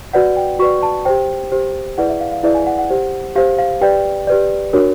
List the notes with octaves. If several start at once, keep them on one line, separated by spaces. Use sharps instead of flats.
F#4 B4 D5 F#5
G5
F#4 B4 D5 C#6
A5
G4 C5 G5
G4 C5
E4 G#4 B4 D5 F#5
E5
F5
F5
E4 G#4 B4 D5 E5
G#5
F#5
F#5
G4 C5
G4 C5 F5
F5
G4 B4 D5 G5
G4 B4 D5
D4 F#4 A#4 C#5